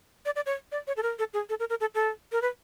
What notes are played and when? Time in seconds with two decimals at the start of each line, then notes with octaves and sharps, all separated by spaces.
0.25 D5
0.36 D5
0.46 C#5
0.72 D5
0.87 C#5
0.97 A4
1.03 A#4
1.19 A4
1.34 G#4
1.49 A4
1.60 A#4
1.70 A#4
1.80 A4
1.95 A4
2.32 A#4
2.42 B4